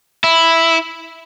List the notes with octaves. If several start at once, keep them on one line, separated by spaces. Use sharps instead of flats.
E4